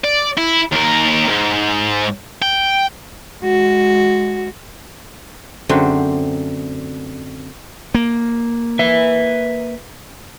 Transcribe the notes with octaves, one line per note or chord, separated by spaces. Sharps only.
D5
E4
D#2 A#4
G#2
G5
G#3 F#4
F#2 D3 A3 C4 C5
A#3
B4 E5